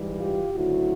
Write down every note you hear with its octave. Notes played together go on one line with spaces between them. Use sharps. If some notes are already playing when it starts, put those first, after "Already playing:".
Already playing: G#2 E3 G3
F4 G4
D2 C#3 F#3 E4 F#4